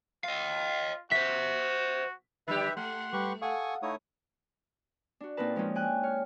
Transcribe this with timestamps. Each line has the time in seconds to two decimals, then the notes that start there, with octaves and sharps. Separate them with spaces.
0.24 F4 D#5 F5
1.11 F#4 C5 E5 B6
2.48 D3 G3 G4 B4 E5
2.77 A3 F#5 C6
3.13 G3 G4 B4 C#6
3.42 A4 F5 F#5 G#5 C#6 D#6
3.83 A3 D#4 E4 C#5 D#6
5.20 D4 F#4
5.37 A#2 A#3 C4 D#4 B4 A5
5.56 F3 G#3 A#3 C#4 D4
5.75 G5 G#5 F#6
6.03 C#5 F6